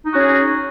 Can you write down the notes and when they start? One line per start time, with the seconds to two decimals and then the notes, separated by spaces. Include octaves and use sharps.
0.06 D#4
0.10 F#4
0.15 C#4
0.20 G#4